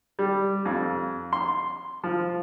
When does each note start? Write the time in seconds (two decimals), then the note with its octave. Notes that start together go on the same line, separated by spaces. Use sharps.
0.19 G3
0.65 F2
1.33 C6
2.04 F3